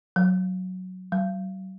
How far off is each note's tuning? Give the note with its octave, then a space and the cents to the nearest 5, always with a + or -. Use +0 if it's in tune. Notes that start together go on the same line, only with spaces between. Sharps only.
F#3 +0
F#3 +40